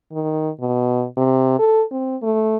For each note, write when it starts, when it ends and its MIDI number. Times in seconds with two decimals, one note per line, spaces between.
0.12 0.49 51
0.60 1.04 47
1.17 1.58 48
1.59 1.83 69
1.91 2.16 60
2.22 2.57 57